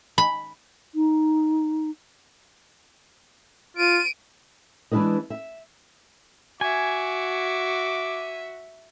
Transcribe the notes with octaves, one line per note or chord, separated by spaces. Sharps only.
B5
D#4
F4 D7 D#7
E3 G#3 D4 E4 B4 D#5
E5
F#4 E5 G#5 D6